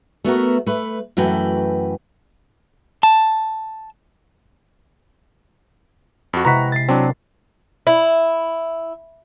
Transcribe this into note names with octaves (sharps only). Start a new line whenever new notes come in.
A3 B3 F#4 A#4
A3 B4
F#2 E3 A3 F#4 B4 G5
A5
F2 F#4
C3 G#3 E4 B4 F#5 A#5 C#6 B6
A6 C7
F#3 C4 D4
E4